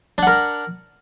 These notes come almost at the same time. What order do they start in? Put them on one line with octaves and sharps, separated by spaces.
D4 F#5 A#4